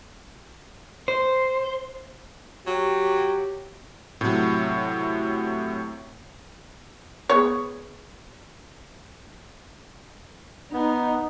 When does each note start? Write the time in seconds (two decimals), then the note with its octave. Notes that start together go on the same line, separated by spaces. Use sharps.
1.08 C5
2.67 F#3 G4
4.21 A2 C3 F#3
7.29 B3 G#4 C#5
10.73 B3 D#4